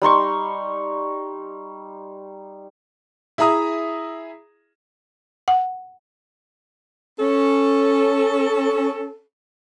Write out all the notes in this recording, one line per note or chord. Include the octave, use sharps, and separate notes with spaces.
G3 D#4 C6 C#6
E4 G#4 E5 A#5 D#6
F#5
C#4 A4